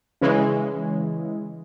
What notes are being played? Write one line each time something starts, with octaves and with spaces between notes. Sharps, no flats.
C#3 E3 G#3